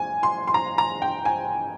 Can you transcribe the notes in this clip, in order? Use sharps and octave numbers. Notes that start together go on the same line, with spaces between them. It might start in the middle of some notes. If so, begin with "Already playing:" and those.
Already playing: G#5
C6
C6
A#5
A#5
G5
G#5